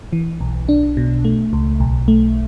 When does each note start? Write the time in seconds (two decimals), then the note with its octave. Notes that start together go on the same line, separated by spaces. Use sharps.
0.13 E3
0.41 B1
0.69 D4
0.97 B2
1.24 A3
1.53 C#2
1.80 B1
2.08 A3